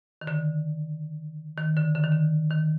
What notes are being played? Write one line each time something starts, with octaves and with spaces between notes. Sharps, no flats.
D#3
D3
D#3
D3
D3
D#3
D3
D#3